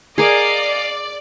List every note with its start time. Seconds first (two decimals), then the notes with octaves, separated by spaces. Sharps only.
0.18 G#4 A#4 D5 D#5 F5